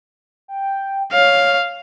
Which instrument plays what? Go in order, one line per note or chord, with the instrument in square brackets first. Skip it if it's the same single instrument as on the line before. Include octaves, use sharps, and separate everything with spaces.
[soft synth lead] G5
[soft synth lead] C#5 [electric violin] F5